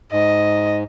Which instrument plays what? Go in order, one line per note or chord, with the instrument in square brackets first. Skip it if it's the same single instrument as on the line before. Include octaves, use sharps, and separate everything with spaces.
[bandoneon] G#2 [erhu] D#5